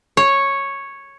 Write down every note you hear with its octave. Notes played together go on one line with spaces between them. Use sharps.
C#5